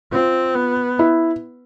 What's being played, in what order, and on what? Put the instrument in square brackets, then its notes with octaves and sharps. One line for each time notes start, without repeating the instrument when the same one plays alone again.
[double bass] C4 [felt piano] F4
[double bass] B3
[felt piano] E4